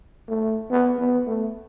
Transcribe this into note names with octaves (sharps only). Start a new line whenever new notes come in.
A3
B3
B3
A3